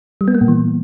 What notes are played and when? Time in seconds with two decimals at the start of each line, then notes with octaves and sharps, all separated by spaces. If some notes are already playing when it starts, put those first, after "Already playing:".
0.21 G3
0.28 B3
0.34 A#3
0.41 A#2
0.48 E3